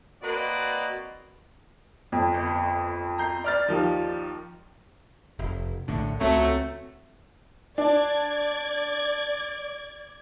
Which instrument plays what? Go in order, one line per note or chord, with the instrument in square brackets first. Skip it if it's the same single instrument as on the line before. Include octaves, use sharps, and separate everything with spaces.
[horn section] A#3 C4 F#4 B4 D5 D#5
[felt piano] F2
[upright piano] G1
A#5 G6 C7
[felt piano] D5 F6 A6
[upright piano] D#2 D#3 F3
[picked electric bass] F1
A#1 A2 D3
[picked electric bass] C#2 C4 [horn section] F#3 A3
[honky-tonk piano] D4 [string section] D5 G#6